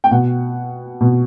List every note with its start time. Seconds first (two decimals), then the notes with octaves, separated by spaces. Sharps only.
0.04 G5
0.11 B2 F#5
1.01 B2